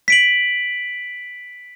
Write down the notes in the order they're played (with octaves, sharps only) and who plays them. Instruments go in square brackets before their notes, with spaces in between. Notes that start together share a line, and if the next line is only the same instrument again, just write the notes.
[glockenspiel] B6 D7 F#7